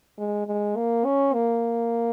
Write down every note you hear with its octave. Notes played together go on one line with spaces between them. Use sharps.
G#3
G#3
A#3
C#4
A#3